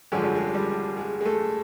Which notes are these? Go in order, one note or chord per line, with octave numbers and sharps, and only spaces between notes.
G#1 F#2 D3 F3 G#3
G3
G#3
G3
G#3
G#3
A3